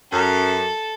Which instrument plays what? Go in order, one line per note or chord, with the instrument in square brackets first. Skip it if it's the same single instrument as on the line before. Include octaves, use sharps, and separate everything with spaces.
[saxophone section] F#2 [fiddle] A4